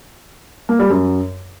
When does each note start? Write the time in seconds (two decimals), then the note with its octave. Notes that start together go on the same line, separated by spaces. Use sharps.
0.69 A#3
0.79 G3
0.90 F#2